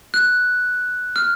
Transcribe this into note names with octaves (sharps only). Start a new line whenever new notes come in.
F#6
F6